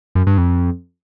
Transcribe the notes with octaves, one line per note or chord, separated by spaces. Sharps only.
F#2
G2
F2